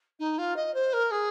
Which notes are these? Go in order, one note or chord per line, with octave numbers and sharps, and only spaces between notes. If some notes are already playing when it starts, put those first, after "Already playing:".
D#4
F4
D#5
C5
A#4
G#4